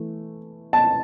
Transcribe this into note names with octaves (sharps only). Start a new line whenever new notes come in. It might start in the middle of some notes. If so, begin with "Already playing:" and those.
Already playing: E3 A3
A5